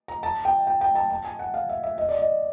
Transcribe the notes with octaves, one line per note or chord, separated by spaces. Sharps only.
A#5
A5
G5
G5
G5
A5
A5
G#5
F#5
F5
E5
E5
D#5
D5
D#5